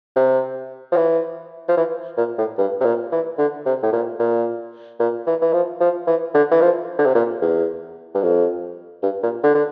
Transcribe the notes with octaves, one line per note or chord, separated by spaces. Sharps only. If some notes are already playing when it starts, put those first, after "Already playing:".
C3
F3
E3
F3
E3
A#2
A2
G2
C3
A#2
E3
D3
C3
A2
A#2
A#2
A#2
E3
E3
F3
F3
E3
D3
E3
F3
D3
C3
A#2
E2
G2
F2
G2
A#2
D3
D3